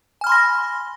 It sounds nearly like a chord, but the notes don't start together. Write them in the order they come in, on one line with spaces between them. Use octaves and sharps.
G#5 F6 B5 C6 A#6